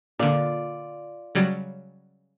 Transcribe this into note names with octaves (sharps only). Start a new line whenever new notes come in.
A#2 D3 F4 D5
C#3 F#3 G3